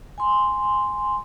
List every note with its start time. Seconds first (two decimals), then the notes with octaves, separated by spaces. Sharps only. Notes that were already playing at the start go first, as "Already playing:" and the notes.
0.18 G#5 C6